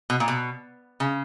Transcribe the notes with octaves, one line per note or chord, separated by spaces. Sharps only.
B2
A#2
B2
C#3